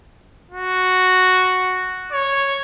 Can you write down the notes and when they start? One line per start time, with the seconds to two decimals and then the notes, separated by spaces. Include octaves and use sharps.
0.51 F#4
2.12 C#5